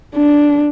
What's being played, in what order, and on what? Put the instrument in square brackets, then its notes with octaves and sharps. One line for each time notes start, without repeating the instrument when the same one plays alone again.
[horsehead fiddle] D4